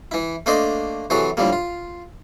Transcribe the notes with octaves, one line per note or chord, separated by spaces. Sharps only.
E3 E4
A3 A#3 D4 C5 D5 D#5
C3 E3 F#3 F#4 G#4 A4
A2 D3 F3 G3 A#3
F4